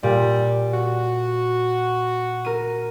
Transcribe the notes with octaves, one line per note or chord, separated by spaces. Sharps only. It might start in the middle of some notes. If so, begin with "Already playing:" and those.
A#2 G3
F#4
A#4 D#7